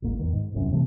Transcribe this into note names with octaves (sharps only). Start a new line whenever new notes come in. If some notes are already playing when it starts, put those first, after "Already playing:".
D1 G1 G#2 A#3
B1 E2 D#3
G#2
E1 C2 F#2 C#4
C3 D#3 E3 A3